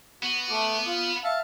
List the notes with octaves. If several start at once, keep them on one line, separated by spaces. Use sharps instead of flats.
B3 F#4
A3 D6
F4 D#6
E5 F5 A5